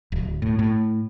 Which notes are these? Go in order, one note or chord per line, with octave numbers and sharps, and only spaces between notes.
D1
A2
A2